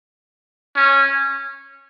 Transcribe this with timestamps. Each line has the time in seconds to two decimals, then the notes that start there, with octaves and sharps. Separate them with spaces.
0.76 C#4